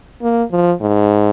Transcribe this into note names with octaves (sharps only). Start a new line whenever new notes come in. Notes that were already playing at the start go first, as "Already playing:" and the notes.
A#3
F3
G#2